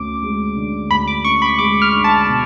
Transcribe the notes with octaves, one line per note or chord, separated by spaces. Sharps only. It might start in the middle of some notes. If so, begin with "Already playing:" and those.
Already playing: D2 C#4 D6
G#3
D3
D2 B5
D6
C#4 C#6
B5
G#3 D6
F6
D3
A5
B2